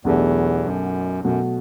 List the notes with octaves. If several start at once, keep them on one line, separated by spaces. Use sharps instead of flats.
B1 E2 B2 A3 D4 G4
F#2
F#2 B2 F#3 A3